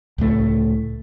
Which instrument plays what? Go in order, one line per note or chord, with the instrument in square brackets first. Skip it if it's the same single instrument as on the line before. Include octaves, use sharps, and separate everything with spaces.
[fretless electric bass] C#2 A2 A3